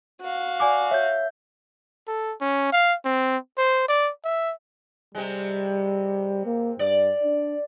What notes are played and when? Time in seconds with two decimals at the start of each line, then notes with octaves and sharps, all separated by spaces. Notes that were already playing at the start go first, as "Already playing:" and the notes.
0.21 F#4 F5
0.60 D5 G#5 D6
0.91 C#5 E5 G6
2.07 A4
2.41 C#4
2.72 F5
3.05 C4
3.58 C5
3.88 D5
4.24 E5
5.15 C3 G3 G#3
6.46 A#3
6.79 G2 D5
7.24 D4